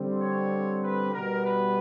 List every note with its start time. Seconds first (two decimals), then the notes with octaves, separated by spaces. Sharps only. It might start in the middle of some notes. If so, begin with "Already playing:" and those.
Already playing: D3 G3 C4
0.19 C#5
0.82 B4
1.12 B2 G3 B3 A#4
1.44 B4